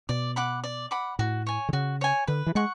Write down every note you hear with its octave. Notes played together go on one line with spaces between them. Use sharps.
B2 D5
F#5 B5 D6
D5
F#5 B5 D6
A2 F#4
C#5 G#5
D3
C#3 F#4
C#5 G#5
D3 B4
E3
G#3 F#5 C#6